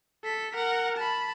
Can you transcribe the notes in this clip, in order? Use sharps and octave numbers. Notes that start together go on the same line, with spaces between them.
A4 B6
A#4 F#5
A5 B5